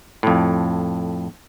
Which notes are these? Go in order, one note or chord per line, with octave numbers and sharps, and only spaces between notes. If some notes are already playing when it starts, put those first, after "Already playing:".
F2 A2